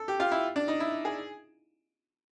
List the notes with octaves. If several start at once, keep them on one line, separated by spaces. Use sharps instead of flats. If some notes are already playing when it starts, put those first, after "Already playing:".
Already playing: A4
G4
F4
E4
D4
D#4
E4
G#4